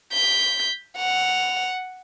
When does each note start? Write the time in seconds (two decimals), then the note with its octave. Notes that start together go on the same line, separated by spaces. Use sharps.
0.12 G6 B6
0.97 F#5 F7